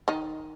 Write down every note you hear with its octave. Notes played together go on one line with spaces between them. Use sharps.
D#3 D#4